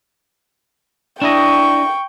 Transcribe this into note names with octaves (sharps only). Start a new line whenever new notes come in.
D4 E4 D#5 G5 C#6